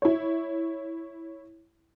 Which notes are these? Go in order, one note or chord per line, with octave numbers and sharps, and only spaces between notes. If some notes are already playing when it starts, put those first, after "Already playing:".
E4 C#5